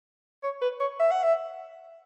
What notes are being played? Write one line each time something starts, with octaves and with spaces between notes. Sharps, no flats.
C#5
B4
C#5
E5
F#5
E5